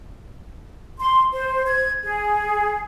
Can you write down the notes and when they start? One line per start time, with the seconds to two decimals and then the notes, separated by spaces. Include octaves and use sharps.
1.00 C6
1.33 C5
1.67 G#6
2.03 G#4